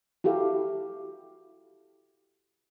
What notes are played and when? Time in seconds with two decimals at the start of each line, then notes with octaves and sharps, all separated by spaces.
0.24 E4 F#4 G4 A4 F5